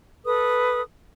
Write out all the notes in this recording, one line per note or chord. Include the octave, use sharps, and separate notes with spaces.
A4 B4 D#6